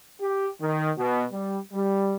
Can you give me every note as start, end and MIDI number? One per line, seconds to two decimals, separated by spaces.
0.20 0.48 67
0.60 0.91 51
0.97 1.23 47
1.32 1.58 55
1.72 2.15 55